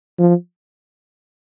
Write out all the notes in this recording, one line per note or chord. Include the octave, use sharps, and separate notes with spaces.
F3